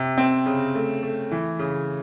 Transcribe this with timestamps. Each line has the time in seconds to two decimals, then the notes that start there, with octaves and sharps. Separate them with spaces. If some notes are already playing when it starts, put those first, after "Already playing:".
Already playing: C3
0.18 C4
0.46 C#3
0.75 A3
1.03 A3
1.31 E3
1.59 C#3